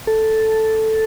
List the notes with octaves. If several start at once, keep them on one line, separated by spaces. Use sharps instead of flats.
A4